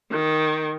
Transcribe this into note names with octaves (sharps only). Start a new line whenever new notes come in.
D#3